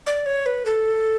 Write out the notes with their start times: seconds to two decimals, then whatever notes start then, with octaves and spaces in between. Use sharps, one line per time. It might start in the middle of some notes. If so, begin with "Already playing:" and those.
0.07 D5
0.26 C#5
0.46 B4
0.66 A4